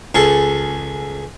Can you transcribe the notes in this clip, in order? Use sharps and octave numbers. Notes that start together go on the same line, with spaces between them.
C#2 G#4 A4